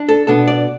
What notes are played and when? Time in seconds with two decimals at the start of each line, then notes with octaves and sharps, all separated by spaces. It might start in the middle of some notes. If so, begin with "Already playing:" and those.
Already playing: D4
0.09 A4
0.27 B2 B3 D4 A4
0.47 D5